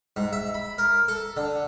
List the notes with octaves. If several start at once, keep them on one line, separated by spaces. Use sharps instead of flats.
G#2
E5
B5
A#4
A4
D3